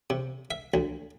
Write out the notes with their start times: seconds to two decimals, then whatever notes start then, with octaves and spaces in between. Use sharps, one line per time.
0.10 C3
0.51 E5
0.74 D2